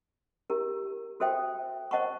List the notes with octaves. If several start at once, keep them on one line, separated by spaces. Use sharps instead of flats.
E4 G4 A#4
F#4 A4 C5 E5 G5
C5 D#5 F#5 A5 C#6